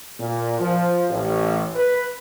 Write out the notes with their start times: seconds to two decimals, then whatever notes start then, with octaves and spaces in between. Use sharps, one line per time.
0.19 A#2
0.60 F3
1.10 A1
1.75 B4